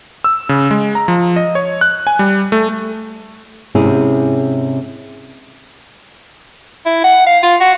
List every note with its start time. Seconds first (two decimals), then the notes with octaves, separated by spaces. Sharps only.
0.24 E6
0.49 C#3
0.71 G#3
0.95 A#5
1.08 F3
1.36 D#5
1.55 C#5
1.81 F#6
2.07 G#5
2.19 G3
2.52 A3
3.75 G#2 C3 C#4 E4 G4 G#4
6.86 E4
7.04 F#5
7.26 F5
7.43 F4
7.60 F#4